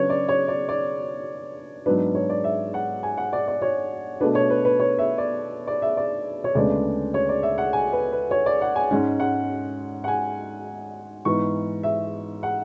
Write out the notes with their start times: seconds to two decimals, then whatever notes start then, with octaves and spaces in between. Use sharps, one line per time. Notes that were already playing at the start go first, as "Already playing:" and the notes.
Already playing: C#3 F#3 B3 D4 B4 C#5
0.10 D5
0.29 C#5
0.48 D5
0.69 D5
1.86 G#2 F#3 B3 D4 B4
2.15 C#5
2.30 D5
2.44 E5
2.74 F#5
3.03 G#5
3.17 F#5
3.33 D5
3.48 D5
3.62 C#5
4.21 B2 A3 D4 B4
4.35 C#5
4.50 B4
4.65 B4
4.80 C#5
4.99 E5
5.18 D5
5.67 D5
5.82 E5
5.97 D5
6.44 C#5
6.55 D2 C#3 G#3 B3 D4 D5
7.14 C#5
7.29 D5
7.43 E5
7.58 F#5
7.73 G#5
7.93 B4
8.12 B4
8.31 C#5
8.46 D5
8.62 F#5
8.76 G#5
8.91 G#2 G#3 C#4 F#5
9.20 F#5
10.04 F#5
10.08 G#5
11.25 G#2 E3 B3 C#6
11.83 E5
12.43 F#5